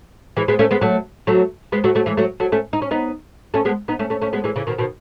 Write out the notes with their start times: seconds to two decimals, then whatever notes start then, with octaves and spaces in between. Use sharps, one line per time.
0.37 E3 G#3
0.48 G#3 B3
0.59 A3 C#4
0.71 G#3 B3
0.81 F#3 A3
1.27 F#3 A3
1.72 G#3 B3
1.84 F#3 A3
1.95 F#3 A3
2.06 E3 G#3
2.17 F#3 A3
2.40 F#3 A3
2.52 A3 C#4
2.73 D#4
2.82 C#4
2.91 B3 D#4
3.54 A3 C#4
3.65 G#3 B3
3.88 B3 D#4
3.99 A3 C#4
4.10 A3 C#4
4.22 A3 C#4
4.33 G#3 B3
4.44 E3 G#3
4.56 C#3 E3
4.67 B2 D#3
4.78 B2 D#3